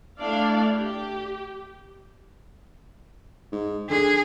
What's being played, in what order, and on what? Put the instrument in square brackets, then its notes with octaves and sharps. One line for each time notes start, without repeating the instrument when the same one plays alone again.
[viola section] A3 D4 E4 D5 F5
G4
[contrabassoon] G#2
[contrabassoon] D3 [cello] G#4